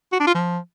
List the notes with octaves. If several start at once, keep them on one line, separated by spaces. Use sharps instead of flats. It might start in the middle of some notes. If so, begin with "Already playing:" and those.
F#4
D4
F4
F3